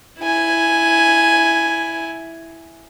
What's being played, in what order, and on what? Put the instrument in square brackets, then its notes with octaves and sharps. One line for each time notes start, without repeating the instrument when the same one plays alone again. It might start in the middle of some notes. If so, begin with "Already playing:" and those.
[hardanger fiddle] E4 G#5